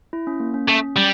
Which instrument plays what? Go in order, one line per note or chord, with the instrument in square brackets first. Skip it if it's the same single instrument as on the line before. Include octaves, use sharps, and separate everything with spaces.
[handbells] E4
C#4
A#3
C#4
[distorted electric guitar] A3 [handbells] C#4
[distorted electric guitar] G3